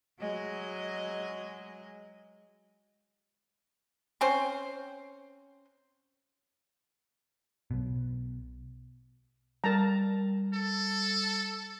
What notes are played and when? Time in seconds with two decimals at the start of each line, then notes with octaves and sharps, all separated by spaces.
0.20 F#3 G#3 D#5
4.21 C4 C#4 C5
7.71 B1 B2
9.64 G3 A#4 A5 A#5
10.54 A4